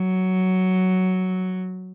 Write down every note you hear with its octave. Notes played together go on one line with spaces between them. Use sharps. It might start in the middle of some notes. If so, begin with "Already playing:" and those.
Already playing: F#3